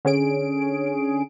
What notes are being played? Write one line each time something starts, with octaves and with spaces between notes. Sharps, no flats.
D3 C#4 G#4 D7